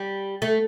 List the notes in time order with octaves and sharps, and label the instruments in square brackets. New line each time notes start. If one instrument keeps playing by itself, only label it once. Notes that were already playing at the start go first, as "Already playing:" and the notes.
Already playing: [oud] G3
A3